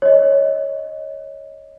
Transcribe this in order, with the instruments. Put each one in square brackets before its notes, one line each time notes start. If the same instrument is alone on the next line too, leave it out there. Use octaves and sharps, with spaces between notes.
[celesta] C#5 D#5